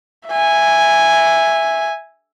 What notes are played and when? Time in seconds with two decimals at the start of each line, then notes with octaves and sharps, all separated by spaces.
0.29 E5 G#5